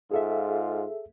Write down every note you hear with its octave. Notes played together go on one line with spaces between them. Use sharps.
G#2 F4 G#4 A4 E5